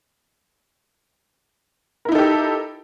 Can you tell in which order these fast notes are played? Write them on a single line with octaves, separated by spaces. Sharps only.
A#4 E4 D#4 A4 G4